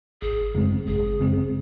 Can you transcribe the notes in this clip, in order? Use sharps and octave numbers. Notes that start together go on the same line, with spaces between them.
G#1 G#4
F#2 C#3 G#3 C4
G#1 G#4
F#2 C#3 G#3 C4